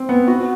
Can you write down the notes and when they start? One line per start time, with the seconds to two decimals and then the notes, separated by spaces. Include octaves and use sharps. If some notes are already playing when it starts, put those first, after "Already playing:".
Already playing: C4
0.09 B3
0.28 F#4